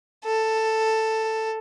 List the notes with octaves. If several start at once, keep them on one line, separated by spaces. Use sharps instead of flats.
A4